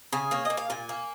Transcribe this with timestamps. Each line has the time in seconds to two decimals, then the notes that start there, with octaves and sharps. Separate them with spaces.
0.12 C#3 G#5
0.31 A#3 C#5
0.45 A#3 D#5
0.57 F5
0.70 A#2 G#5
0.89 A#3